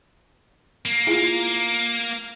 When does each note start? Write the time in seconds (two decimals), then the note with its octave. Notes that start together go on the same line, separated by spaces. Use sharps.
0.85 A#3
1.07 E4 F4 G#4